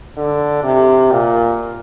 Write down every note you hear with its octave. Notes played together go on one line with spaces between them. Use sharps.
D3
C3
A#2